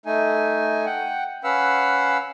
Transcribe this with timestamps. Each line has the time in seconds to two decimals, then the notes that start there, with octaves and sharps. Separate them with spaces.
0.06 A3 D#4 G#5
0.86 F#5 G5
1.44 C#4 B4 F5 F#5 E6